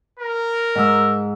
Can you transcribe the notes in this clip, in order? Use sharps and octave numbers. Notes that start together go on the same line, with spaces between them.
A#4
G#2 E6